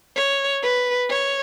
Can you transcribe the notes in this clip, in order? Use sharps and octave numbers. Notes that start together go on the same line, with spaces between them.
C#5
B4
C#5